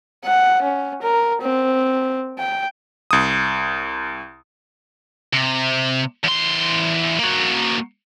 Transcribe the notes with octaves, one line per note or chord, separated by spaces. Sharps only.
F#5
C#4
A#4
C4
G5
C2 D#6
C3
E2 C6
A#3 F#4